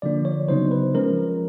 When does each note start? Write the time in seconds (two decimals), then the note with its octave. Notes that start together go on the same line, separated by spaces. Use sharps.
0.02 D3 F3 A#3 D4 D5
0.25 C#5
0.48 C#3 F#3 B3 D#4 C5
0.71 B4
0.94 F3 G#3 C#4 A#4